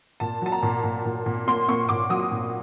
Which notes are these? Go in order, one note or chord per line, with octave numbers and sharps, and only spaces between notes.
A#2 A5
F#3 A5
A#5
A#2
A#2
A#2
A#2
A#3 C6
A#3 C#6
A#2 D6
F#3 D#6
A#2